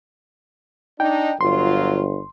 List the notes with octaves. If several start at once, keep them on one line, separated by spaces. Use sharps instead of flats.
D4 D#4 G5
G1 F#3 F4 C6